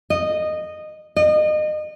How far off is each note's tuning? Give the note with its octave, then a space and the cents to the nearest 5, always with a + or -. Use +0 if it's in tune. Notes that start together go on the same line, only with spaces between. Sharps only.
D#5 -15
D#5 -30